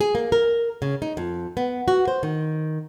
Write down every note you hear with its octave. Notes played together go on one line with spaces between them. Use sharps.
G#4
A#3
A#4
C#3
D#4
F2
B3
F#4
C5
D#3